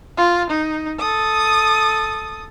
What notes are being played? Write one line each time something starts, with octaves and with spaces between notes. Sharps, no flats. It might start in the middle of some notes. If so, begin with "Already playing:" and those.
F4
D#4
A4 D#6